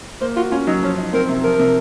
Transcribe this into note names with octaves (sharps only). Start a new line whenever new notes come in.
A#3 C5
F4 F#4
C#4 F4
F#3 D#4
F3 C#4
D#4
C4 A#4
C3
F3 A#4
C3